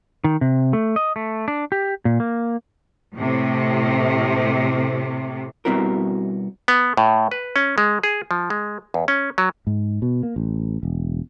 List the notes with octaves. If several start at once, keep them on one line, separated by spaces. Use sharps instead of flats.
D#3
C3
A3
D#5
A3
D4
G4
A#2
A#3
A2 C3
B2 G3 C4 E4 F#4 A#4
B3
A2
B4
C#4
G#3
G#4
F3
G#3
E2
C#4
F#3
G#2
B2
A#3
A1
E1